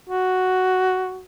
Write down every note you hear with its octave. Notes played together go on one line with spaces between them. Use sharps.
F#4